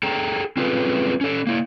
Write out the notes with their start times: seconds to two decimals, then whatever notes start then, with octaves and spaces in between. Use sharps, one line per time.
0.03 G#4 A4 G5 A#5
0.57 C4 C#4 F4 G#4 A4 B4
1.21 C#4 A4
1.47 A#3 E4